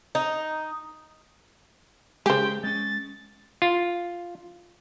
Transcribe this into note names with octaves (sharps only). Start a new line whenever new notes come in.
D#4
C#3 G#3 G4 G#4 C5 G5
G#3 A3 C#4 A6
F4